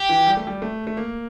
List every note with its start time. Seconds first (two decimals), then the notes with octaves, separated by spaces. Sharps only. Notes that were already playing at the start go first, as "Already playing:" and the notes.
Already playing: G4
0.09 E3
0.27 G3
0.37 A3
0.47 G3
0.62 A3
0.87 A3
0.97 A#3